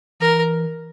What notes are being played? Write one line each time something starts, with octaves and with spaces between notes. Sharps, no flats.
E3 A#4